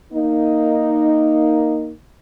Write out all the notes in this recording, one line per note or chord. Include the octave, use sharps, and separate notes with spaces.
A#3 D#4